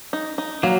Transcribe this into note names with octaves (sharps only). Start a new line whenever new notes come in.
D#4
D#4
F#3 A#3